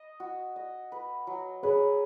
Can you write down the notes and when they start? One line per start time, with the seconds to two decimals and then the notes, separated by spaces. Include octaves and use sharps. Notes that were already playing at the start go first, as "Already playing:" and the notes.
Already playing: D#5
0.20 F#4
0.56 D#5
0.92 B4
1.27 F#3
1.63 G#4 B4 C#5